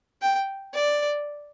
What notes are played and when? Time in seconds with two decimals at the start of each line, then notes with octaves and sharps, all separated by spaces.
0.22 G5
0.74 D5